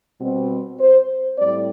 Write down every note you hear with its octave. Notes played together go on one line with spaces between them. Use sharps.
B2 G3 C4
C5
A2 G3 C4 D5